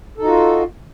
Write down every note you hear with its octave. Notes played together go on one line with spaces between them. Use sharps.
D#4 F4 F#4 A4